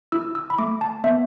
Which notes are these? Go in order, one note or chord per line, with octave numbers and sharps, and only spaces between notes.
E4 E6
E6
B5
A3 D6
A5
B3 E5